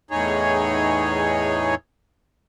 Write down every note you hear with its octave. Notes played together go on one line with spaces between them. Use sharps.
E2 A2 D#4 G#4 C#5